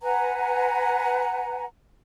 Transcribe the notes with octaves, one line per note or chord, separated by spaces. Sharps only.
B4 F#5 G#5 A#5